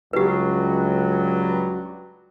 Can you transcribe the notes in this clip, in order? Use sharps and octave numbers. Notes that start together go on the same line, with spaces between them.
C#2 G2 F#3 F#4 G4 B4